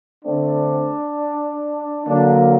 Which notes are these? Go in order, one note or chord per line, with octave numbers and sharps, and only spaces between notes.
D3 A3 C4 D4
D3 F#3 A#3 D4